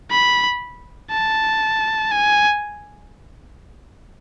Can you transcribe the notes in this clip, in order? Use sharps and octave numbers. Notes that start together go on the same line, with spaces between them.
B5
A5
G#5